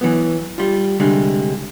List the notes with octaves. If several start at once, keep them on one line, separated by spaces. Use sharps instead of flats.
E3 F#3 B3
G3 F4
C2 D3 G3 G#3